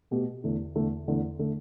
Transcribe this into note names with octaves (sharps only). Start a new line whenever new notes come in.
B2 A3 G4
E2 D3 A3
E2 D3 A3
E2 D3 A3
D3 A3